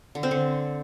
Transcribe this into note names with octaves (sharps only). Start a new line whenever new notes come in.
D3
C4
D3